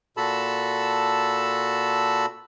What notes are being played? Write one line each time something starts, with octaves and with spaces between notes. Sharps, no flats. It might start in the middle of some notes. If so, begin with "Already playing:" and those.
A#2 F#4 A4 A5 B5 E6